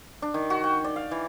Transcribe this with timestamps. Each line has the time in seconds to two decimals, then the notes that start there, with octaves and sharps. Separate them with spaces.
0.22 D4
0.34 D#3
0.50 F#4
0.64 G5
0.84 D5
0.96 F5
1.11 E3